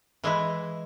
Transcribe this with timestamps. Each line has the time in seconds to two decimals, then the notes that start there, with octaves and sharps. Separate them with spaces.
0.24 E3 G#3 E4